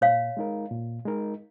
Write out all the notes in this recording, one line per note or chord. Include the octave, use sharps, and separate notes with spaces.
A#2 C#5 F5
G#3 D#4 A#4
A#2
G#3 D#4 A#4